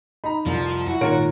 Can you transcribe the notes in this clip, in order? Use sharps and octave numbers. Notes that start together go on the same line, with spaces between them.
D#4 A#5 B5
C2 F2 F3
E4 F#4
G#1 A#2 D#3 F4 A#4 C#5 D7